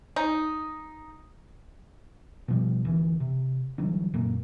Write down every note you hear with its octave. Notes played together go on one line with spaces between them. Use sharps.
D#4
B2 F3 G3
D2 E3
C3
D3 E3 F#3 G3
F#2 A#2 A#3